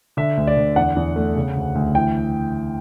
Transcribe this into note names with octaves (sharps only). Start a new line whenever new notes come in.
D3 E5
D2
D5
D3
E2 F#5
E2
A3
C#3
D2
D2
E3 G5